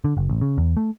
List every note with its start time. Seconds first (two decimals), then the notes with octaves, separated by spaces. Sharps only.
0.04 D3
0.17 F#1
0.29 A1
0.41 C#3
0.58 E2
0.77 A3